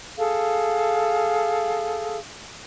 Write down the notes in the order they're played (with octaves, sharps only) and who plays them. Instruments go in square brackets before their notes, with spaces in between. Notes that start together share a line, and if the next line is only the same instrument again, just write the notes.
[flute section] G#4 A4 F5